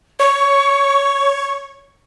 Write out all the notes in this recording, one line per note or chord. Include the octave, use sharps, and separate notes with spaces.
C#5 C#6